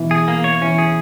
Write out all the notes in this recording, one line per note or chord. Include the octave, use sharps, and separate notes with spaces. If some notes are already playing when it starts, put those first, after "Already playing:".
Already playing: B2 E3
G#4
A#3
C#5
E3 C#4
G#4